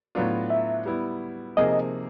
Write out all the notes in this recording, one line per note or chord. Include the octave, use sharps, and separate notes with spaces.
A2 F#3 B3 D4 F4
E5
G3 B3 E4
C3 F3 A#3 D#4 G#4 D#5